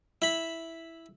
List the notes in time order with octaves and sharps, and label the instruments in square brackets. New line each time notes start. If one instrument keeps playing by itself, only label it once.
[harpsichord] E4 B5